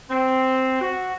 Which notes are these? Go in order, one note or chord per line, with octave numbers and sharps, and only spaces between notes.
C4
F#4